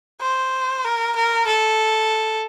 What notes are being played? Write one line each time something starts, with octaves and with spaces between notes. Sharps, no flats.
C5
A#4
A#4
A4